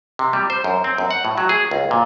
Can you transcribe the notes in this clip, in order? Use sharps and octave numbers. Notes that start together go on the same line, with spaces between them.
C3
G3
C5
F#2
C4
F#2
F#5
A2
F#3
G#4
C#2
A#2